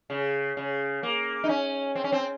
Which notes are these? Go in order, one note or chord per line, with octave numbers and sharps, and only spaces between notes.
C#3
C#3
A#3
D#4
C#4
C4
C#4
C4